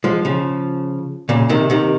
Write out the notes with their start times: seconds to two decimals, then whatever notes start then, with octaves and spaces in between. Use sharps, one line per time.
0.04 F3 G#3
0.25 C#3 F3
1.29 A#2 C#3
1.49 C3 D#3
1.70 C3 D#3